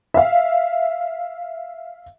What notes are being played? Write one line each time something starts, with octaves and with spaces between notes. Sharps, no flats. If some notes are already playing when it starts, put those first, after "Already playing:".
E5 F5